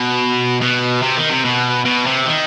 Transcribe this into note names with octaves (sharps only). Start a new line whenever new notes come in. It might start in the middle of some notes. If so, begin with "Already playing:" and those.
Already playing: B2
B2
C3
D#3
C3
B2
B2
C3
D#3